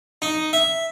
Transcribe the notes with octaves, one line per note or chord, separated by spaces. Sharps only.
D#4
E5